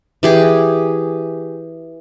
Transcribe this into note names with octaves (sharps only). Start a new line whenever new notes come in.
E3 G4 G#4